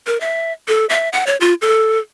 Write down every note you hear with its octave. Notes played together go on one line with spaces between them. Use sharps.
A#4
E5
A4
E5
F#5
C#5
F4
A4